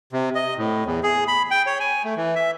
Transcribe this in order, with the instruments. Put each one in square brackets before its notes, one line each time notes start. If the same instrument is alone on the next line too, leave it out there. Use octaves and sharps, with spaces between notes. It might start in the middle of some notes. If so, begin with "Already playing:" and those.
[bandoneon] C3
D#5
A2
E2
G#4
B5
G5
C#5
G#5
A3
E3
E5